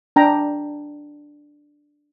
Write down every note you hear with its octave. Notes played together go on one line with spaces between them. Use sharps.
D4 G5 A#5